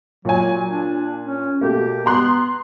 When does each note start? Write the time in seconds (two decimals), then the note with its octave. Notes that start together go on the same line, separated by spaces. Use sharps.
0.25 A#2 F#3 G#5
0.69 D4
1.24 C#4
1.61 B2 A3 A#3 G4
2.06 B3 A#5 C6 F#6